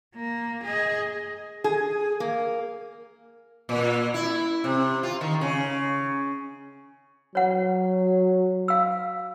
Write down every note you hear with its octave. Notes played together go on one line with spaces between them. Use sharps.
A#3
G#4 D#5
G#4
A#3
A#2
E4
C3
F4
D#3
C#3
F#3 C#5 F#5
F5 E6